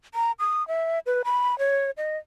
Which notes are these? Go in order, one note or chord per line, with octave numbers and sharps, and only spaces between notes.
A#5
D#6
E5
B4
B5
C#5
D#5